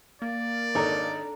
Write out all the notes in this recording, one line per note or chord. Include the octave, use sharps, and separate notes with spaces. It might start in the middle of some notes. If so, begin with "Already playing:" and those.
A#3 D5
G#1 D4 D#4 A4 C#5 A#5